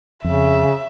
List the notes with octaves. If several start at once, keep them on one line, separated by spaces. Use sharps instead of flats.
F2 C#3 E5